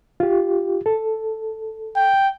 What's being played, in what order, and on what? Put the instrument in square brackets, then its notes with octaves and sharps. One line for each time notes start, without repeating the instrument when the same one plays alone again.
[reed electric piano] F4 G4
A4
[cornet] G5